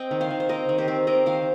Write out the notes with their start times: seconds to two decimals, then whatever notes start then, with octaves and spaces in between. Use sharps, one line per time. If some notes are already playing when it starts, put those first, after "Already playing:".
Already playing: C4 D#5 G5
0.11 D#3
0.21 C5 F5
0.31 D#3
0.40 C5
0.49 C4 A#4 D#5
0.69 D#3
0.78 G4 C5
0.88 C4
1.07 C4 A#4 D#5
1.26 D#3 C5 F5